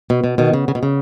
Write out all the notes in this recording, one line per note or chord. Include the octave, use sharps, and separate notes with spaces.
B2
B2
B2 D#3
C#3
C#3
B2
C#3